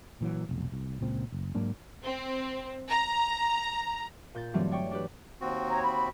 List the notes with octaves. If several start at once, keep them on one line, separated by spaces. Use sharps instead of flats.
A#2 E3 F#3
F1 B1
C2
C#2 A#2 C4
F#1
G#2 F#3 A#3 D4
C4
A#5
A#2 G6 A6
G2 D3 E3 F#3 A3 C4
C#5 D5 G5 C#6
D4 G4 B4
D#2 C4 F#4
C#5 A#5
B5